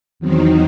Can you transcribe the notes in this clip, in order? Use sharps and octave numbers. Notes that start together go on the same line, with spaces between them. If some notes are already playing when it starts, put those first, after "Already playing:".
E2 D#3 F#3 C4 D#4